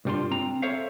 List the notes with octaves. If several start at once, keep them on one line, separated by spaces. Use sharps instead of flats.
C2 G2 G3 D4 F4 C6
C4 A#5
A4 C5 C#5 E5 F5